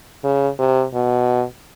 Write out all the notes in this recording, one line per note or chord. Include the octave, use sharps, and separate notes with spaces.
C#3
C3
B2